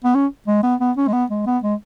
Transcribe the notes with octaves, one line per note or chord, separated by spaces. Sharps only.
B3
C#4
G#3
B3
B3
C#4
G#3
B3
G#3
B3
G#3